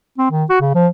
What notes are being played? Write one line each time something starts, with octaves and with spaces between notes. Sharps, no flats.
C4
D#3
F#4
C#3
F3